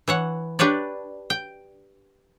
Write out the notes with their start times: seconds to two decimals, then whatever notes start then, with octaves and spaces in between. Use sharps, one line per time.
0.08 E3 C#5 F#5
0.59 D4 G4 B4 C#5 D5
1.30 G5